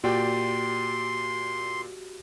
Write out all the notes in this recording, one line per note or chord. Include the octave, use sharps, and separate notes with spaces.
A#2 F#4 G4 D5 G5 C6